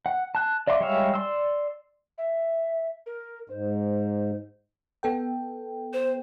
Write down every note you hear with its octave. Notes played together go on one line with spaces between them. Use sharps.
F#5
A5 F#6
D5 E5 F5 C6 D6
G3 G#3 C#5 E5 F5
D5 C6 E6
E5
A#4
G#2 C5
B3 A4 G5
C5